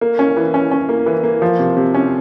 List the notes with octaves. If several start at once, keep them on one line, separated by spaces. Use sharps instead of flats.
A#3
C#4
E3
C#4
C#4
A#3
E3
A#3
F3
C3
C3
C#4